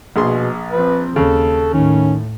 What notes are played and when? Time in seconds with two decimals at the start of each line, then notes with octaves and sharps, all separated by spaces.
0.16 A#1 B2 G#4 C6
0.71 F3 C4 B4
1.16 D#2 C#3 A4
1.74 A2 D#3 C#4